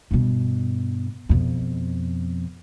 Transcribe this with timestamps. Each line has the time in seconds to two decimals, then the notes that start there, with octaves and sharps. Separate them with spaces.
0.11 G2 B2
1.29 F2 B2